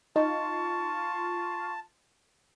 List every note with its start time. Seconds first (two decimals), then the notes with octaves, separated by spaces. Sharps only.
0.16 D#4 F4 A5 C#6